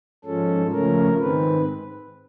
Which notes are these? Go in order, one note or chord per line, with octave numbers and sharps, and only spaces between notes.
G#2 F3 G#3 C#4 A4
C#3 F3 A3 C#4 A#4
G#2 D#3 G#3 C4 B4